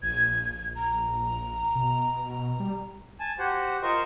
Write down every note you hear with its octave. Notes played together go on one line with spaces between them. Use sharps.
A#1 G#6
A#5
B2
G3
G#5 A5
F#4 G4 C5 F#5
F4 A#4 C5 D#5 C6 C#6